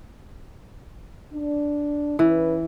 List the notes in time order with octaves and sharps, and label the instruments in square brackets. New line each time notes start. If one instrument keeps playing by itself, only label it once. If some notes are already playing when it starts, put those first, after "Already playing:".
[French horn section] D4
[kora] E3 [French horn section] C#4 B4